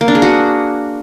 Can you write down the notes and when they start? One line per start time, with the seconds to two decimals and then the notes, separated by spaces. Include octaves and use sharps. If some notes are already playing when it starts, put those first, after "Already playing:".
0.01 A#3
0.08 D4
0.15 G#4
0.22 F#4